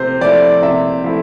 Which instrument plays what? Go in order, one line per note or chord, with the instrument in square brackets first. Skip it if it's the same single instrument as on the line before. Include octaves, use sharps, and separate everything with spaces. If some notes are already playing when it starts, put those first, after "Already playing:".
Already playing: [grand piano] C3 F3 A3 C5
F3 A3 E4 D5
C3 E5
F3 A3 E4